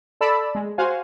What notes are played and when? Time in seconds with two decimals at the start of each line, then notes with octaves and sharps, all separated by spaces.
0.21 A4 D5 A5 B5 E6
0.55 G#3
0.78 F#4 C5 F5 F#5 G#5